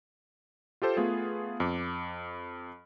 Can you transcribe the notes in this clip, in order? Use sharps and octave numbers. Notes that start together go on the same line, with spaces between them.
F4 G4 A4 C5
A3 B3 F4 G#4
F2 D6